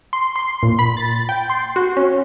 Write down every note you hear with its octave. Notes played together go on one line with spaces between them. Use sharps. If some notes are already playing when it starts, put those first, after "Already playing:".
C6
C6
A#2
B5
A6
G5
C6
F#4
C#4